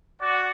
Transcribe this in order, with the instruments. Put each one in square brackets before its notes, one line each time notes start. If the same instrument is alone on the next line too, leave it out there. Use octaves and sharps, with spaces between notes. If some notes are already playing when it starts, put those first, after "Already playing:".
[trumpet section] F#4 [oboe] D5